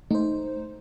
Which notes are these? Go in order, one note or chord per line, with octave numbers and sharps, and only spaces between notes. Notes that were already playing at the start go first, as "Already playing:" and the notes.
A3 D#4 C5